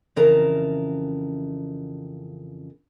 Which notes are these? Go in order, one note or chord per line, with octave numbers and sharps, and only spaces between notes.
F2 C#3 E3 A#4 A5 A#5